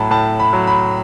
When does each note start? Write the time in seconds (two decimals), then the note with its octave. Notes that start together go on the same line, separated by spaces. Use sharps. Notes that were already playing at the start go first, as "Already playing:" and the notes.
Already playing: A2 F#3 A5 B5
0.11 A2 A5
0.40 B5
0.53 F#3
0.67 B5